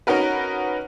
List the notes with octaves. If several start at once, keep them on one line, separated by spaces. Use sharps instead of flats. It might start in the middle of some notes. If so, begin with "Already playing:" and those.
C#4 D#4 F#4 A#4 B4